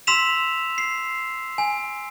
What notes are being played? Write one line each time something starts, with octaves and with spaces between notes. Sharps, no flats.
C6 E6 B6 E7 F7
C7
G#5